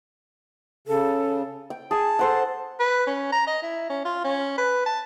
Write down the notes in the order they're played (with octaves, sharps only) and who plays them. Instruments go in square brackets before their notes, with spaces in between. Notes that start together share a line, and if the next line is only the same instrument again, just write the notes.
[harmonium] C#3 [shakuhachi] A4
[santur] G5
[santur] G#4 G#5 [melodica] A5
[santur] A4 C5 F#5
[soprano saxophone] B4
C#4
A#5
D#5
E4
C#4
F4
C#4
B4
A5